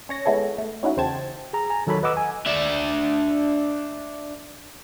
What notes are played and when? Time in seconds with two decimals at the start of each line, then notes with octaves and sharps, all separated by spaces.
0.09 C#4 C#5 A#6
0.25 G#3 B3 E4 G#4 A4 C#5
0.58 A3
0.83 C#4 D#4 E4 F#4
0.97 E2 C#3 C5 G5 A5 G#6
1.53 G#4 A#5
1.70 G#5 A#5
1.87 D#3 F#3 A4 C#5 B5
2.03 B4 D#5 F#5 D6 E6
2.17 G#5
2.47 D4 E5